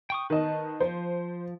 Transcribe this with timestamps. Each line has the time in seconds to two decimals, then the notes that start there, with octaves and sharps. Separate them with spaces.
0.10 G5 C#6 D#6
0.30 D#3 B4 D#5 A5
0.80 F3 C5